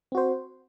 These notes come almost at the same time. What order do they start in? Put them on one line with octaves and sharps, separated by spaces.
C4 F#4 C5